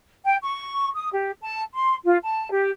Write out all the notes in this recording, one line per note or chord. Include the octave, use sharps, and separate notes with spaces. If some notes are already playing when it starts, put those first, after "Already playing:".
G5
C#6
D#6
G4
A5
C6
F4
A5
G4